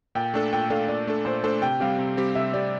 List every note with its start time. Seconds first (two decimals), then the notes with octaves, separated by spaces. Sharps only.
0.15 A#2 G5
0.34 A3 D4 A4
0.53 A#2 G5
0.70 A3 D4 A4 F5
0.88 A#2 D5
1.07 A3 D4 A4
1.25 A#2 C5
1.44 A3 D4 A4 C5
1.62 C3 G5
1.80 G3 C4 G4 F5
1.98 C3
2.17 G3 C4 G4
2.35 C3 E5
2.53 G3 C4 G4 D5